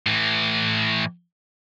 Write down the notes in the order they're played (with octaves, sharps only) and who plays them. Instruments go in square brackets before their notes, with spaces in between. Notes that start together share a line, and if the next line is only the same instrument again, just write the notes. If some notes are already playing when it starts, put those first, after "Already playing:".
[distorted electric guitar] A2 E3